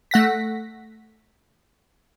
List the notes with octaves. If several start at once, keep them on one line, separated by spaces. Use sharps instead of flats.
A3 F#5 A#6 B6